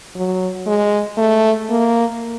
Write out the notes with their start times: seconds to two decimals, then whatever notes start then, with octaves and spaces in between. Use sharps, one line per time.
0.15 F#3
0.66 G#3
1.18 A3
1.70 A#3